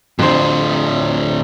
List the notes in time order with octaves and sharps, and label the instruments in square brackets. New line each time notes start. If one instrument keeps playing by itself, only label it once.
[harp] F2 C5 [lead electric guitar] A2 D3